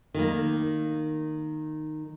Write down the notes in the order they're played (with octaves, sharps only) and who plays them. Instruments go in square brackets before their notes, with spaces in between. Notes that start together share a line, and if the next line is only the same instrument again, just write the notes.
[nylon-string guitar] D#3 A#3